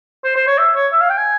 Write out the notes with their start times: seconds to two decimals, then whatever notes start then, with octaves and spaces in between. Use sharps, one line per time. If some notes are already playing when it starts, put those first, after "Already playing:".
0.24 C5
0.36 C5
0.47 C#5
0.58 E5
0.75 C#5
0.92 E5
1.01 F5
1.10 G5
1.18 G#5